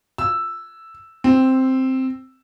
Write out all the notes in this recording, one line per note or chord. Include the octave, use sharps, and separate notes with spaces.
E6
C4